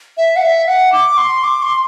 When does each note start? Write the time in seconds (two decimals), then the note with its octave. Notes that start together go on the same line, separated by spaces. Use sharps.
0.17 E5
0.36 F#5
0.42 E5
0.67 F#5
0.92 D6
1.17 C6
1.43 D6
1.63 C6